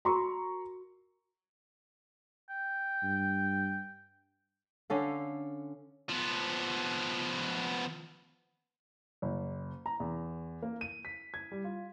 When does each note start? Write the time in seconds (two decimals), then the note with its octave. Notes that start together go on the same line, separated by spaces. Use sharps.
0.05 F#4 A#4 A#5 C6 C#6
2.50 G5
3.03 G2
4.90 D3 C#4 A4 F5
6.09 F3 B3
9.22 F#1
9.86 A#5
10.00 E2
10.62 A#3
10.81 D#7
11.05 B6
11.34 G#6
11.52 G3
11.64 F4